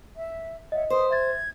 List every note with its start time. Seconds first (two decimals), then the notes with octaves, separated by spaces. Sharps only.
0.15 E5
0.72 C#5 D#5 E5 F#5
0.90 B4 C5 D#6
1.11 E5 G#6 A6